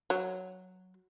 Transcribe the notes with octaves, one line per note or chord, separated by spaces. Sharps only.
F#3